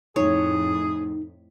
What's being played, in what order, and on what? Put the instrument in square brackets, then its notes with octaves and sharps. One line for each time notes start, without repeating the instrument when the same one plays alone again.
[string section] F2 A2 [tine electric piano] D#4 [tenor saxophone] G#4 [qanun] C#5